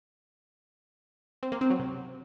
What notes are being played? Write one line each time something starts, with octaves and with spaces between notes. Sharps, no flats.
C4
A#3
C4
F#3
C3